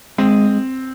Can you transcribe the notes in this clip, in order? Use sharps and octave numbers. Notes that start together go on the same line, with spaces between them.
G#3 C4